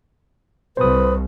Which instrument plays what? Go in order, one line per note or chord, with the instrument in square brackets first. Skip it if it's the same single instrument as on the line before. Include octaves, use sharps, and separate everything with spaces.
[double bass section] C2 [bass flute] B4 [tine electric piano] C5 D#6